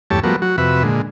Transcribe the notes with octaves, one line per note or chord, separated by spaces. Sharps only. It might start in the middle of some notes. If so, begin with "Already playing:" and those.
E2 G2 A3 G4 C#5 A5
F3 G3 A3 B3 F#4 A#4
F#3 F#4
F2 C3 F#4 B4 E5
A#2 D3 G#3